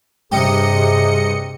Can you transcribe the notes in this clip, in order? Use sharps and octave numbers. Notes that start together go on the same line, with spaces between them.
G2 C3 G4 G#4 D#5 C#7